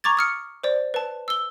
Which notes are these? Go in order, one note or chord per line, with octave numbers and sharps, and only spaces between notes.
A#5 C#6 D6 G#6 A6
D#6 F6 C#7
C5 D5
B4 A5
E6 G7